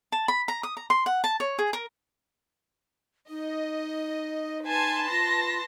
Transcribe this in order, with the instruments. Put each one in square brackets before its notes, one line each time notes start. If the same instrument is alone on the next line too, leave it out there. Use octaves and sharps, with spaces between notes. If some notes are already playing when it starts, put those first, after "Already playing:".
[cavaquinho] A5
B5
A#5
D#6
A#5
C6
F#5
A5
C#5
G#4
A#4
[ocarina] D#4 [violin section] D#5
[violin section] B4 A5 C6 [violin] G#5
[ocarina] F4 [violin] A#6